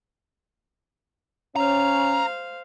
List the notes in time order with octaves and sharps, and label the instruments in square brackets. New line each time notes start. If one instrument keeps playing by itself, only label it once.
[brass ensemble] C#4 [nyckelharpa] C5 F5 [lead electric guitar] A#5